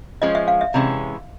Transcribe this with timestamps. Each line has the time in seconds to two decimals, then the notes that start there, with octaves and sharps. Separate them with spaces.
0.22 F3 G#3 C#4 D#5
0.35 E5
0.48 F5
0.61 E5
0.74 C3 E3 G#3 C#4